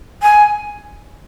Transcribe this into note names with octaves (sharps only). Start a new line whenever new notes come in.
G#5